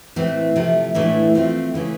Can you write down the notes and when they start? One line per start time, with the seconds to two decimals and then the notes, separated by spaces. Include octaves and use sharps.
0.16 A2 E3 A3 C4
0.55 C3 F3 A3
0.94 A2 E3 A3 D4
1.35 F3 A3 C4 F4
1.74 C#3 E3 A3 C#4